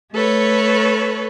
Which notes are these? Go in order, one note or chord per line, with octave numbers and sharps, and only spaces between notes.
A3 A4 B4 C#5